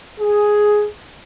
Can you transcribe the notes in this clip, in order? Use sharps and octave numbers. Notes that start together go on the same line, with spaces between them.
G#4